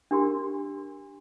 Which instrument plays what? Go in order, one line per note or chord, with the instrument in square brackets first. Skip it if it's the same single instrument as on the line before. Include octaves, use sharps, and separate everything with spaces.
[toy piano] D4 G4 A#4 C6